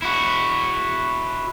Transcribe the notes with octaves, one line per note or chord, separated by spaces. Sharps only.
E4 F#4